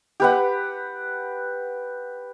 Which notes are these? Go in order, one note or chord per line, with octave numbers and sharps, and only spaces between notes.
G4 B4 F#5